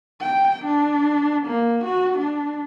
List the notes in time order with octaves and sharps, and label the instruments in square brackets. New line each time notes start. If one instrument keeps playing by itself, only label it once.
[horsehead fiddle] G5
D4
A#3
F#4
D4